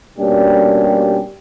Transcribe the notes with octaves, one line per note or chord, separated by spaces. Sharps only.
B2 G3 A#3 C#4 D4 G4